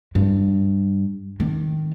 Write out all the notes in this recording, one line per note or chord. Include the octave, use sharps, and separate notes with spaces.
G2
D#3